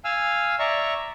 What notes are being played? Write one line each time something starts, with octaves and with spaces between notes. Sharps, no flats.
F5 G#5 E6 F6
D5 E5 A#5 C#6